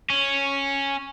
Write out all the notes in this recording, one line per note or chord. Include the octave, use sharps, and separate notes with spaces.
C#4